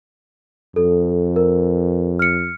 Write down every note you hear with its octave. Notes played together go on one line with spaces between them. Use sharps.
F2 A4
A#4
F6 C#7